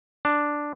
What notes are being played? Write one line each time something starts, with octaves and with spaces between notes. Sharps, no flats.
D4